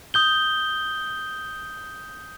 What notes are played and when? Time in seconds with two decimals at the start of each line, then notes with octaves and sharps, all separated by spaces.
0.14 D#6 G6 G7